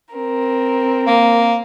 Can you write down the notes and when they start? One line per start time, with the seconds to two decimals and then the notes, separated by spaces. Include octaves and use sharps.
0.15 C4 A#4
1.07 A#3